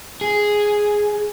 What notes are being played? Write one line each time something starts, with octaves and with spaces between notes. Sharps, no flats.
G#4